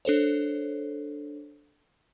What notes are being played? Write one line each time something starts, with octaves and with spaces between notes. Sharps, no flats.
D4 A4 C5 C#5